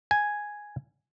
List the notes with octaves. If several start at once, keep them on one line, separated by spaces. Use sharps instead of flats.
G#5